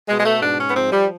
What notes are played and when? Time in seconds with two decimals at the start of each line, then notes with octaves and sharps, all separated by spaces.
0.08 B2 G#3
0.18 G#3
0.25 A3
0.42 G#2 D4
0.59 C#4
0.69 B3
0.75 F3 C4
0.91 G3